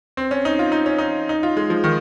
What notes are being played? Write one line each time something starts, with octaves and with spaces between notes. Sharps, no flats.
C4
C#4
D#4
F4
D#4
C#4
D#4
D#4
F4
G#3
F3
D#3